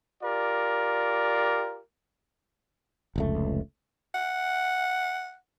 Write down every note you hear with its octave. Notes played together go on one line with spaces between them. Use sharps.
F4 G4 A#4 D5
F1 C#2 A3
F#5